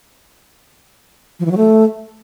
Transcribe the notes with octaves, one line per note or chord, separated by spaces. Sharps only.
F3
E3
F#3
A3